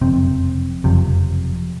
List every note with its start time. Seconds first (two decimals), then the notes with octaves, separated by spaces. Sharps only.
0.01 F#1 F2 C3 C4
0.84 F#1 F2 C3